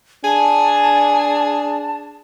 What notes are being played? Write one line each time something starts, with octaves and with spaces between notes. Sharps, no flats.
D4 G#4 G#5 A5